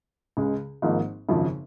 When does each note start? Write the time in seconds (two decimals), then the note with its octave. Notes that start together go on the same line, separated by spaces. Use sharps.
0.37 C#2 C#3 G#3
0.82 G#1 G#2 F3 A#3 D#4
1.29 G#1 F#2 C#3 F3